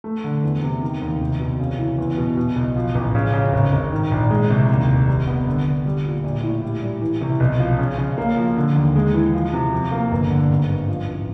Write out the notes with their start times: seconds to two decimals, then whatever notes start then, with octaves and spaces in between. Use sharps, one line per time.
0.04 A3
0.24 D3
0.43 E2
0.62 C3
0.82 D#3
1.02 D#2
1.21 C2
1.40 B2
1.60 C#3
1.79 E3
1.98 E2
2.17 B2
2.37 B2
2.56 B1
2.76 F3
2.95 A1
3.15 C#3
3.34 C#3
3.53 G#1
3.72 G#1
3.92 D#3
4.11 A#1
4.31 G#3
4.50 C2
4.70 D#2
4.89 F1
5.08 G3
5.27 B3
5.47 D3
5.66 D3
5.86 G3
6.05 A#2
6.24 A#1
6.43 A2
6.63 G3
6.82 G3
7.02 E3
7.21 C2
7.40 B1
7.59 F3
7.78 C#3
7.98 C#3
8.18 A#3
8.37 F3
8.56 D3
8.76 D#2
8.96 G#3
9.14 E3
9.34 F3
9.53 C3
9.73 F2
9.92 A#3
10.12 G1
10.30 D3
10.50 G#1
10.69 G2
10.89 F3
11.09 A1